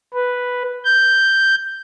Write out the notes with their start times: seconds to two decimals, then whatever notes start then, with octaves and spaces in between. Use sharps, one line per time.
0.14 B4
0.85 G6